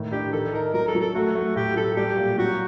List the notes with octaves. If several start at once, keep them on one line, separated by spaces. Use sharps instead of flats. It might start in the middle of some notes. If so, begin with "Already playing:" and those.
Already playing: A2 D#3
D4 G4
D#3 A4
D#4 A#4
F#3 A#4
A4
F#3
A4
A3 F#4
A3
A2 G4
F#3 A4
G3 G4
A#2
F#3 F#4